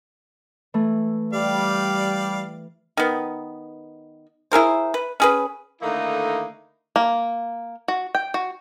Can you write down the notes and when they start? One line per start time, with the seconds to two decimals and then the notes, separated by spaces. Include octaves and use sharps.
0.74 E3 A3
1.33 G3 D5 F5
2.97 D#3 B3
4.52 E4 G#4 A#4 C5
4.94 B4
5.20 C#4 G#4 B4
5.82 D3 D#3 A3 A#3 D#4 E4
6.96 A#3
7.88 F#4
8.15 G5
8.34 F#4